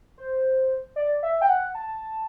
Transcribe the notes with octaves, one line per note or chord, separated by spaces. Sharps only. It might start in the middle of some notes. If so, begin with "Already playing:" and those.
C5
D5
E5
G5
F#5
A5